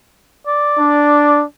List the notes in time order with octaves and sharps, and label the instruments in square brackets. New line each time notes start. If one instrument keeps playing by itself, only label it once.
[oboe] D5
[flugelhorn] D4